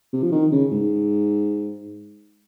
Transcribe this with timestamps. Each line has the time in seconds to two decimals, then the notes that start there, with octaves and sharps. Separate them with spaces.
0.13 C3
0.23 F3
0.32 D#3
0.52 C#3
0.72 G#2